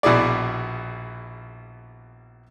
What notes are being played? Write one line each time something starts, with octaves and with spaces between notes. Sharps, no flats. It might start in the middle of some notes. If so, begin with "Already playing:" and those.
A#1 B2 E4 G#4 D5